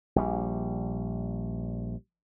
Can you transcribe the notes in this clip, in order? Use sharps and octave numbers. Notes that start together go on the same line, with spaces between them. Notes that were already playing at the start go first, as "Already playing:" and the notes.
A#1 G3